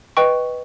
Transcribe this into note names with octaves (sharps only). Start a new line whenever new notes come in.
B4 D#5 G5 C#6